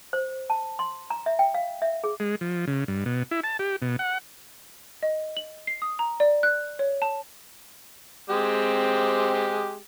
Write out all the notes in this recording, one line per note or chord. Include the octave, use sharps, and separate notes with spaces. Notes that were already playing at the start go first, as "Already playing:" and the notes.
C5
A5
C6
A#5
E5
G5
F5
E5
G#4
G#3
F3
C#3
G2
B2
E4
A5
G4
B2
F#5
D#5
F#7
C7
D#6
A#5
D5
F#6
C#5
A5
G#3 C4 G4